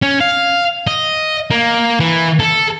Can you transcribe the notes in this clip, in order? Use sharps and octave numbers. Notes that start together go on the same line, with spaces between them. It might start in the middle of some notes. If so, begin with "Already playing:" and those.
C#4
F5
D#5
A#3
E3
A4